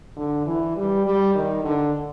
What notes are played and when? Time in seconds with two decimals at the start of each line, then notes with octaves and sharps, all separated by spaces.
0.16 D3
0.46 E3
0.76 G3
1.06 G3
1.34 D#3
1.64 D3